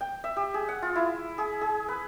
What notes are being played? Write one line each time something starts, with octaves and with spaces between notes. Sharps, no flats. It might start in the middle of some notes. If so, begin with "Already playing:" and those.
G5
E5
G4
G#4
F#5
F4
E4
G#4
G#4
B4